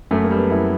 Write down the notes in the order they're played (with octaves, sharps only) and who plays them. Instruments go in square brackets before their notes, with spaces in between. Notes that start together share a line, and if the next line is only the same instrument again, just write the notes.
[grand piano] F#2 A3
A#3
G3
B3
F#2 E4